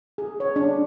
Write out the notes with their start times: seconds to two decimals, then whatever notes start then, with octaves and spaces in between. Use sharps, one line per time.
0.18 G#4
0.40 C#5
0.56 D4